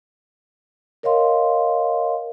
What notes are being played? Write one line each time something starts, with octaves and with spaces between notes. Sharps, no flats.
A#4 C#5 D#5 F5 C6